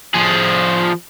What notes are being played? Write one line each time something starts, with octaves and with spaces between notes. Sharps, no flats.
F3 G#4